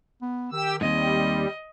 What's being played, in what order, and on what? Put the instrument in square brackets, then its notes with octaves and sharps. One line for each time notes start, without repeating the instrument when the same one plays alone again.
[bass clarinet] B3
[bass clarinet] D#3 [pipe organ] G4 E6
[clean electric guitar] D#2 G#2 [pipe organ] G3 [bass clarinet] C4 [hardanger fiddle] D#5